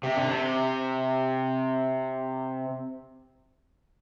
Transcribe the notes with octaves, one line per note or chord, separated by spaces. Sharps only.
C3
D3
C3